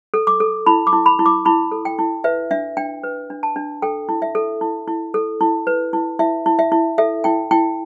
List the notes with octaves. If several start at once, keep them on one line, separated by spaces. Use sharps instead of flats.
A4
D6
A4
E4 B5
D6
E4
B5
E4
D6
E4 B5
A4
G5
E4
B4 E5
D4 E5
D4 G5
B4
D4
A5
D4
A4 G5
E4
E5
A4
E4
E4
A4
E4
B4
E4
E4 E5
E4
E5
E4
A4 E5
E4 G5
E4 G5